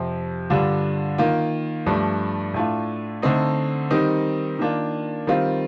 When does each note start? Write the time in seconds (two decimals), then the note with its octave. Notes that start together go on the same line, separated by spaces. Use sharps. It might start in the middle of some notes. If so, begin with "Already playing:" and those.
Already playing: F2 C3 F3 C4
0.50 G2 D3 G3 D4 F4
1.18 D#3 A#3 F4
1.86 G2 F3 A3 D4
2.54 A2 A3 D4 F4
3.22 D3 A3 C4 D#4
3.91 D#3 G3 C4 D#4
4.59 D#3 A#3 D4 F4
5.27 D#3 G3 C4 F4